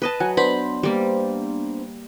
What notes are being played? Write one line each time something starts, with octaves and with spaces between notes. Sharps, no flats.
B4 D#5 A5
F#3 F#5 G#5
B3 D4 C5 B5
G3 A#3